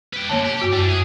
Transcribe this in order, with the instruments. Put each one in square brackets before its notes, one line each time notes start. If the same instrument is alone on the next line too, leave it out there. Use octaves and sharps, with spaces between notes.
[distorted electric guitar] B4 G5
[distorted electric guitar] F#2 D3 [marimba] A#3 C#5 A5
[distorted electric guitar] G4
[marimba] G2 F#4 D6
[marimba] F#2 [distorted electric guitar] A3 D4
[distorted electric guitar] G#4